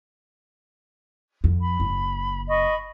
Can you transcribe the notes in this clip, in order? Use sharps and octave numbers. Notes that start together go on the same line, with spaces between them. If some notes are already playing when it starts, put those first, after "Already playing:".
F2
B5
F#1
D#5 B5 C#6